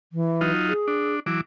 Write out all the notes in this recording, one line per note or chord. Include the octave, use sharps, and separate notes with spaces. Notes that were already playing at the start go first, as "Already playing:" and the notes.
E3
F#3 D#4 F4
G#4
D4
E3 F#3 D6